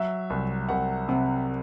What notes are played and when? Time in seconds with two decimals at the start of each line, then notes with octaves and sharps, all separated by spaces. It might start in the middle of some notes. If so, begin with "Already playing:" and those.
Already playing: F#3 E5
0.30 C2
0.69 C2 F#5
1.09 C3 F#5